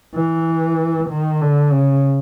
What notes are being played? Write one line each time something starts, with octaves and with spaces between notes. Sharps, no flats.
E3
D#3
D3
C#3